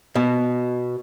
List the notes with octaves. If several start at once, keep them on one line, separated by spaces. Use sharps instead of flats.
B2